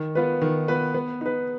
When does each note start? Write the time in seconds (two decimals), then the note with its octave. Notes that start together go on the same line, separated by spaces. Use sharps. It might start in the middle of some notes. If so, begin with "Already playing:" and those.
Already playing: D#3
0.15 B3 F4 B4
0.42 D#3
0.68 B3 F4 B4
0.95 B3
1.21 D#4 B4